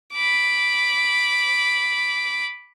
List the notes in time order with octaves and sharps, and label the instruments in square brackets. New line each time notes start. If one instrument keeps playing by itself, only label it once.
[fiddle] B5 D6